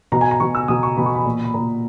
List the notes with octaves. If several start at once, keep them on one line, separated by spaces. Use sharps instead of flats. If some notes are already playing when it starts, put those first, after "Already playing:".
B2 A#5
G#5
A#5
B2 C#6
E6
B2 D#6
C#6
B2 B5
C#6
B5
A#2
B5
A#2 A#5